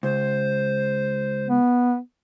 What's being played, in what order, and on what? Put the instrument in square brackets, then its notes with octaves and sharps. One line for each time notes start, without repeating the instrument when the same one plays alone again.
[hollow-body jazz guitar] C#2 [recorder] C5
[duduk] B3